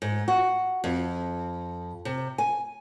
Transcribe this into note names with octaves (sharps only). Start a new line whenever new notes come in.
G#2
F#4
F2
C3
G#5